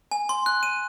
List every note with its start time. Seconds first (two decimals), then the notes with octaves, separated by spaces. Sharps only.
0.11 G#5
0.29 C6
0.46 F#6
0.63 D#7